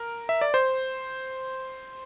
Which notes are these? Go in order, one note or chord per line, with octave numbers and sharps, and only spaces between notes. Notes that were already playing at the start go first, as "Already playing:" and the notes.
Already playing: A#4
E5
D5
C5